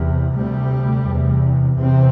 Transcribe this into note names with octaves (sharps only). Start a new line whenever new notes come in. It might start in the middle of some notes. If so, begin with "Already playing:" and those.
Already playing: E2 C3
D2 C3 G3
E2 C3
E2 C3 C4